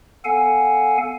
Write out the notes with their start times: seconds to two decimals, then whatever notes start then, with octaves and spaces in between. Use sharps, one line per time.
0.25 B3 A4 F5 F#5 G#5